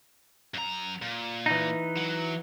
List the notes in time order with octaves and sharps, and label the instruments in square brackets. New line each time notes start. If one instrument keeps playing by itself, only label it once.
[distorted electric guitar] F#2 A#5
A#2
[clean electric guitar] E3 D#4
[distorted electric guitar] F#3